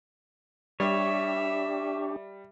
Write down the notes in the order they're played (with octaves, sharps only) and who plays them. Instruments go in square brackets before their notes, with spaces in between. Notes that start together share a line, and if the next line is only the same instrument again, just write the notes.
[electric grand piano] G3 [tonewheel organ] D4 G4 [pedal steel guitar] C#5 [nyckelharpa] E5